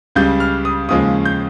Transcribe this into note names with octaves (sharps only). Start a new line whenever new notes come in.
C#2 C#3 G3 G6
F6
D#6
D#2 C#3 F3 G#3 D#6
G6